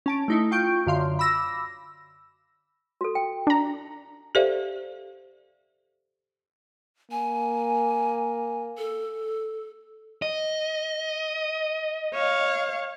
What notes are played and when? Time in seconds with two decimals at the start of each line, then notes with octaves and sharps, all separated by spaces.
0.06 C#4 A5 D7
0.28 A3 D#4 E4
0.51 F4 G5 C#6 G6 D7
0.86 F#2 D3 F5 C6
1.19 B5 D6 E6 A#6
3.01 F#4 A4
3.15 G5
3.47 D4 A#5
4.35 G4 A4 C5 D5 E5 F5
7.11 A#3 G#5
8.78 A4
10.22 D#5
12.14 C#5 F5